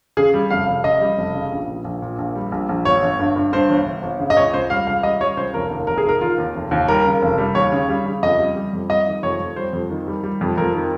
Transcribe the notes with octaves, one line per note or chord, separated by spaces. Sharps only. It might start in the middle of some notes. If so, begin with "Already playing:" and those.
C#3 G#4
G3
F1 F5
F1
C#3 D#5
G3
F1
C#3
A#1
A#2
A#1
A#2
A#1
G3
A#1
A#1
G1 C#5
G1
G2
G2
G2 C5
G1
G1
G1
C#3
D#5
C#2 C#5
C#2 C5
G3 F5
C#2 F5
G3 D#5
G3 C#5
C#2 C5
F1 A#4
D#2
F1 A#4
G#4
D#3 A#4
D#3 F4
D#2
F1
D#2
G3 A#4
C#3
F1
G3
D#2 C#5
C#3
G3
C#3
F2 D#5
G3
G3
F2
G3 D#5
D#3
F2 C#5
F2
G3 C5
F2
D#3
G3
G3
F2
F2 A#4
D#3